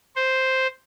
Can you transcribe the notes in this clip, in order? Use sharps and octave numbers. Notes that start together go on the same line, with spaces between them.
C5